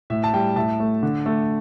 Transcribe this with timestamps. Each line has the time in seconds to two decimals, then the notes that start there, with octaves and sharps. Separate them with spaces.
0.10 A2 E5
0.24 A5
0.33 G3 G5
0.56 A2 E5 A5
0.80 A3
1.03 D3
1.26 A3